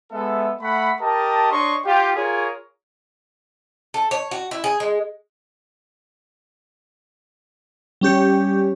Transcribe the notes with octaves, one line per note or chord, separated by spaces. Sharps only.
G#3 B3 A4 E5
A3 F#5 B5
G4 A#4 D#5 A5
D4 C#5 D#5 C6 C#6
F4 G4
F4 G#4 A#4 C#5
A4
C#5
F#4
E4
G#4
G#3
G3 C#4 G4 C#5